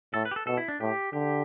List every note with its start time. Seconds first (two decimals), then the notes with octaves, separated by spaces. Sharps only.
0.14 A2 A4
0.25 B4
0.31 G4
0.36 A4
0.47 B2 A4
0.57 E4
0.68 D4
0.80 A2 G4
1.13 D3 G4